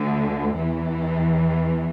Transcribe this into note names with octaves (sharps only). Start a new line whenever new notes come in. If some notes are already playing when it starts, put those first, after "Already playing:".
Already playing: D2 D3
E2 E3